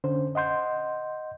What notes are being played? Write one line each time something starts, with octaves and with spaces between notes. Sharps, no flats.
D3 C#4 C5
D#5 F#5 C6 G6